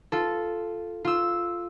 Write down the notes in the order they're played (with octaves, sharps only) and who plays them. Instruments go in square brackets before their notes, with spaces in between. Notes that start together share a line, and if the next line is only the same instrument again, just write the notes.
[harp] F4 A4
F4 E6